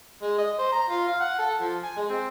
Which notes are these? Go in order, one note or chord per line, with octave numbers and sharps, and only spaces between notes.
G#3
D#5
C5
A#5
F4
F5
F#5
A4
F3
G#5
G#3
C4